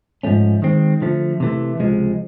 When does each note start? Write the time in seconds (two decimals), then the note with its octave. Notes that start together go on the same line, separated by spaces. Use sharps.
0.23 G#2 F3 A3 C#4
0.62 D#3 G#3 C4
1.02 D3 F3 A3
1.40 C3 E3 A3
1.79 C#2 C3 F3 G#3